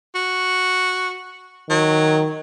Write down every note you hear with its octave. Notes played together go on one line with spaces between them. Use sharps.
F#4
D#3 F#3